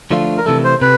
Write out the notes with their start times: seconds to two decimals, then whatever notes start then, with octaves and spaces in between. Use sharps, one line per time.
0.11 D3 F3 A3 D4 F4
0.38 A#4
0.46 C3 E3 A3 A4
0.64 C5
0.82 C3 B4